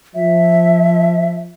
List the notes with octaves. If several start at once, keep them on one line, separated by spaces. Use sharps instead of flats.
F3 E5